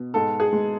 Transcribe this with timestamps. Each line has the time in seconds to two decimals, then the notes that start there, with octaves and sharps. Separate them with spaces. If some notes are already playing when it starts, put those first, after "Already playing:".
Already playing: B2
0.14 G#2 A4
0.40 G#4
0.53 G#3